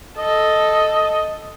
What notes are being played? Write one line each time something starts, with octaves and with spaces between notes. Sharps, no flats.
A4 D#5